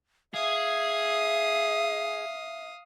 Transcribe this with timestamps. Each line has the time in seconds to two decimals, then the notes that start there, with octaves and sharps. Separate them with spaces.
0.34 G#4 E5 F5 D#6